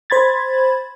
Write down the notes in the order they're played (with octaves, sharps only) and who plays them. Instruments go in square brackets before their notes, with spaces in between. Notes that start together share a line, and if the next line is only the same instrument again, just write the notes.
[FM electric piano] C5 B5 G#6 A6